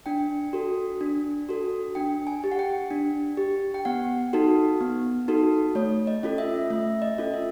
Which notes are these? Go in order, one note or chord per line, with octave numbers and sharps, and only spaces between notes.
D4 G5
F#4 A4
D4
F#4 A4
D4 G5
G#5
G4
F#5
G5
D4
G4
G5
B3 F#5
D#4 F#4 A4
B3
D#4 F#4 A4
A3 C#5
D#5
C#4 F4 A4
E5
A3 E5
D#5
C#4 F4 A4
E5